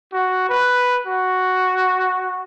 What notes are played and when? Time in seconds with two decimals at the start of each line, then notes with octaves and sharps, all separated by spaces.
0.13 F#4
0.49 B4
1.07 F#4